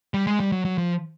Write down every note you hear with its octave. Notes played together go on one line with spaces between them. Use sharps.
G3
G#3
G3
F#3
F#3
F3